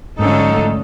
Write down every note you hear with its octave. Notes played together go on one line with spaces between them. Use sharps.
G#2 D3 F3 F#3 A3 C#4 D#4 A4